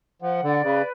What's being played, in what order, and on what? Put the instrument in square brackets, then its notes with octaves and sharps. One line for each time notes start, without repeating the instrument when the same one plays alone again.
[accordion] F3 [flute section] F#5
[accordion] D3 [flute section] D5
[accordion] C#3 [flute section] B4